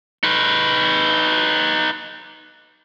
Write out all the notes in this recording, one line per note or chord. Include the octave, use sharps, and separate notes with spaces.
D#4 B4